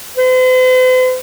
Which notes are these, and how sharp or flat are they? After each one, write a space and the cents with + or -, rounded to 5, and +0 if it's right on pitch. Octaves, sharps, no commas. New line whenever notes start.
C5 -45